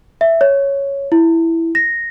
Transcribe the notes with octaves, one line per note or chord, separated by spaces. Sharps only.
E5
C#5
E4
A#6